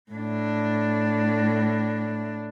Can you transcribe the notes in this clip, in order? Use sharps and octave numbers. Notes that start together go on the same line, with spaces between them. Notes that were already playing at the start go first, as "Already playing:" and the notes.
A2 D4